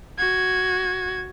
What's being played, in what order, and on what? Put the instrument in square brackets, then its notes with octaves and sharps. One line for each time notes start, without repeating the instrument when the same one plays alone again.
[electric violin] F#4 G#6